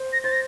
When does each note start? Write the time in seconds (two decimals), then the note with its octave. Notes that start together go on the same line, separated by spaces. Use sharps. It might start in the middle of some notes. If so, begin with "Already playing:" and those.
Already playing: C5
0.13 A#6
0.24 C5 A6
0.32 A#6